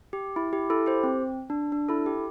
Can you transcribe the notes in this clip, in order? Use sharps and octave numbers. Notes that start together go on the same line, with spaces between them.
G4
E4
G4
E4 A4
G4 C5
C4
D4
D4
E4 A4
G4